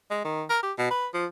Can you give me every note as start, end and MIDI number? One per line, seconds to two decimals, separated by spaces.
0.11 0.22 56
0.25 0.44 51
0.50 0.60 70
0.63 0.72 67
0.78 0.90 47
0.90 1.07 71
1.14 1.26 53